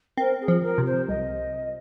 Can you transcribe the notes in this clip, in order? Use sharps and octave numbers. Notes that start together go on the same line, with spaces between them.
C4 A#4
G#4
F3
A#4
C3
C5
C2 D#5